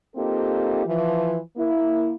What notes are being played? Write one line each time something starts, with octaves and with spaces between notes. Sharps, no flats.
A#3 C4 D#4 F4 G4 A4
E3 F3
A#3 E4